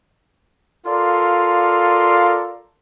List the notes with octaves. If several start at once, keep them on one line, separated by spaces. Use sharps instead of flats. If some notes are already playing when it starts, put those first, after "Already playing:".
F4 A4 A#4 D5 F5 C6